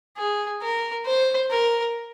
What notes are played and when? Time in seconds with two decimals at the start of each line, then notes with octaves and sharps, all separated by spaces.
0.17 G#4
0.62 A#4
1.06 C5
1.51 A#4